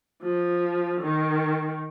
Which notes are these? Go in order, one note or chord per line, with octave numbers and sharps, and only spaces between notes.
F3
D#3